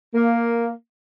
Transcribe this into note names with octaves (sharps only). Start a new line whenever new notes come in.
A#3